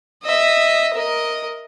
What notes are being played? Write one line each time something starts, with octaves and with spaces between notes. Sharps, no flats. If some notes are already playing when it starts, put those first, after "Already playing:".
D#5 E5
A#4 D#5